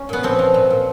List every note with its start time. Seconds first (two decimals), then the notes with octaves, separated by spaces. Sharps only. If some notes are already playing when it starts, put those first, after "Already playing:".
Already playing: C#4
0.09 A#2 B3
0.23 F3 C4
0.39 F3
0.54 A#2
0.70 A#2